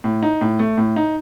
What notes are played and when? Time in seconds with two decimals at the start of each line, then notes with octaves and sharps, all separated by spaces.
0.04 A2
0.23 D#4
0.41 A2
0.59 A3
0.78 A2
0.96 D#4